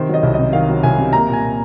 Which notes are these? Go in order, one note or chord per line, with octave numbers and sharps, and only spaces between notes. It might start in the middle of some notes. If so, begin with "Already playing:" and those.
Already playing: C3 D#3 C5
F#3
D#5
C2
C3 D#5
D#3 F5
F#3
C2 G#5
C3
A#3 A#5
A#2 G#5
A#2